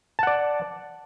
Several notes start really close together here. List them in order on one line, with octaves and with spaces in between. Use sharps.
A5 F#5 D5